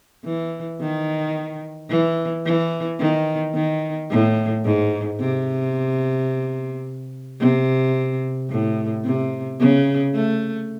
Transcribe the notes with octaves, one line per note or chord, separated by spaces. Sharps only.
E3
D#3
E3
E3
D#3
D#3
A2
G#2
C3
C3
A2
C3
C#3
A3